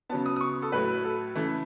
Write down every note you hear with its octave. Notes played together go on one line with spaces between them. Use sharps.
C#3 F#3 B3 A5
D#6
D#6
C#6
A4
A2 F#3 A3 B4
A4
C#3 E3 A3